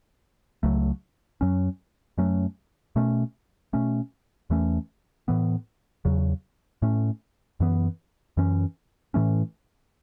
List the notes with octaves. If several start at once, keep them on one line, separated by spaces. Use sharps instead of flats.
C#2 C#3 F#3 A3
F#2 F#3 C#4
F#2 F#3 A3 C#4
B2 A3 C#4
B2 A3 C#4
E2 E3 A3 C#4
A2 E3 B3
E2 C#3 F#3
A2 A3 C#4
F#2 E3 B3
F#2 E3 C#4
A2 E3 A3 C#4